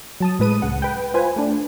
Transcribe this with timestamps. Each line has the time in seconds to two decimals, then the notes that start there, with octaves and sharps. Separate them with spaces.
0.20 F#3 A5 D#6
0.39 A2 G#3 B4 D#6 D#7
0.62 C#2 C#3 F#5
0.82 B4 G5
1.14 F4 B4 C5 G#5
1.36 A3 D4